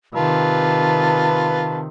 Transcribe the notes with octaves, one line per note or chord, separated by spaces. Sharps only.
C3 D#3 F4 B4 A5